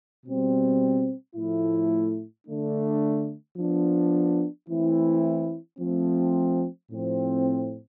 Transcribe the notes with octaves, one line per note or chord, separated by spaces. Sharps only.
B2 G3 C4
A2 F3 A3 E4
D3 A3 D4
F3 B3 D4
E3 A3 C4 E4
F3 A3 C4
A2 F3 C4